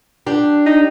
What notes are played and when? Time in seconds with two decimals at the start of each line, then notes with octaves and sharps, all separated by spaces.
0.26 D4 G4
0.66 D#4